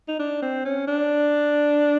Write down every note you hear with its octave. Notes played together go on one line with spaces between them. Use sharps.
D#4
D4
C4
C#4
D4